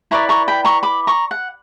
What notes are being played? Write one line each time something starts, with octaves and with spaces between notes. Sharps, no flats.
E4 B4 D5 A#5 C#6
A#5 C#6
G5 B5
A#5 C#6
B5 D6
A#5 C#6
F#5